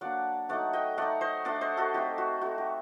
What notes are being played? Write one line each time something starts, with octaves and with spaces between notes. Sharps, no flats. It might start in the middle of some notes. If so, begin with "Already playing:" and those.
F#3 A#3 D4 D5 F#5
F#3 A3 D#4 D5 F#5
D#5 G5
A3 D#4 D5 F#5
C5 D#5
A3 D4 D5 F#5
C5 D#5
F#4 A4
A3 C4 D#4 G4
F#4
A3 D#4 F#4
G4